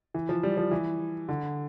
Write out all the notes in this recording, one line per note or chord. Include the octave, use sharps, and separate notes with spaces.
E3
F3
G3
F3
E3
D3